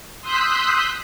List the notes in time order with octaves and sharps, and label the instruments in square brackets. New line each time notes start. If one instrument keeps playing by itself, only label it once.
[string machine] C6 D#6 E6 F#6 G6 B6